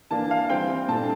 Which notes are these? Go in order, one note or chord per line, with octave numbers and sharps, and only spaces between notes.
E3 A#3 D4 A5
F5
E3 G3 C4 G5
A#2 A3 D4 A5